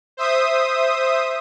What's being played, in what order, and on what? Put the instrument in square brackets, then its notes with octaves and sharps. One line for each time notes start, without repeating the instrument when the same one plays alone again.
[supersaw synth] C5 E5 D#6